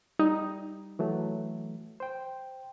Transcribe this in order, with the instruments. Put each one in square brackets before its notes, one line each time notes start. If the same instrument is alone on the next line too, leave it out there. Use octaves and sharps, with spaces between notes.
[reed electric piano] G3 [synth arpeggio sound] D#4
[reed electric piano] E3 F#3 A3
C5 G5